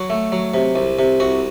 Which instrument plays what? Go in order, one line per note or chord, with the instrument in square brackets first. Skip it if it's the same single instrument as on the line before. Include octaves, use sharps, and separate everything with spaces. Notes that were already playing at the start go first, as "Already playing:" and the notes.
Already playing: [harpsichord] F#3 F#4
A3
F#3
C3
C2
C3
C2 F#4